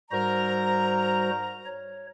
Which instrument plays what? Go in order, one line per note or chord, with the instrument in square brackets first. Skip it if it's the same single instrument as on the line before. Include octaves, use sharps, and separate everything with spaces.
[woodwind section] G#2 A#4 A#5 [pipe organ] G3 F#4 C5
[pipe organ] C#5